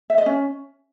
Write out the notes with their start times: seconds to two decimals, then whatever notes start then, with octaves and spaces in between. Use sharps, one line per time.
0.10 E5
0.18 D#5
0.26 C#4